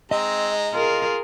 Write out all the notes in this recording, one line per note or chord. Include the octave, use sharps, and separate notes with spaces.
G#3 C4 D#4 D#5 A#5
F4 G#4 A#4